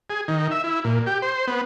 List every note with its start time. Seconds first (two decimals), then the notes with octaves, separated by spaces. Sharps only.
0.10 G#4
0.28 D#3
0.51 E5
0.64 E4
0.84 A#2
1.06 G4
1.22 C5
1.47 B3